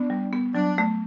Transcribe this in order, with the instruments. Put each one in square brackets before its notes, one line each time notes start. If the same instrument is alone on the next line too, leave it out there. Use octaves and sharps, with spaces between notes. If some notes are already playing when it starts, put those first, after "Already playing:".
Already playing: [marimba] B3 [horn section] D4
[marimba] G3
B3
[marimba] F#3 [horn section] D4
[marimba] A3